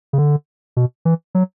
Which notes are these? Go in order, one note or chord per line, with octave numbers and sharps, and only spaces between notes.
C#3
D3
B2
E3
F#3